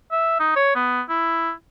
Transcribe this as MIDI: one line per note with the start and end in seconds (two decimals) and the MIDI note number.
0.12 0.36 76
0.40 0.52 63
0.56 0.74 73
0.75 1.01 59
1.09 1.52 64